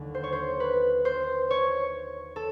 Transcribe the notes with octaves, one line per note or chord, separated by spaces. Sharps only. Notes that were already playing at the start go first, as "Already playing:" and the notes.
Already playing: D#2 D3 F#3
C5
C#5
C5
B4
C5
C#5
A4